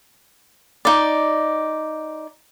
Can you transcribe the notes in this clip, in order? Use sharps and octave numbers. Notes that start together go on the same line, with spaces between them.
D#4 D5